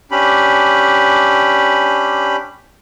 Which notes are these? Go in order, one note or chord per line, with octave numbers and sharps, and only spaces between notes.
C#4 D4 G4 B5